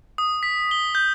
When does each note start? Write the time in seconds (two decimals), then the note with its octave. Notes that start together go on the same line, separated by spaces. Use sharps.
0.18 D#6
0.43 B6
0.71 G7
0.95 G6